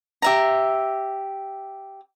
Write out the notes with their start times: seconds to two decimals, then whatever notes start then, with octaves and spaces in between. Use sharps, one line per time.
0.22 G4 E5 A#5